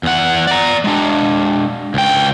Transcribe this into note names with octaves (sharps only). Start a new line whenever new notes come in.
E2 F#5
D5 A#5
G#3 D4
C#2 G5